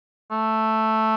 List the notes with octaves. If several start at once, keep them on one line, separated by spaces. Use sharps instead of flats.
A3